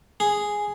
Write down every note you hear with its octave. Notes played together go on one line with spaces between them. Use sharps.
G#4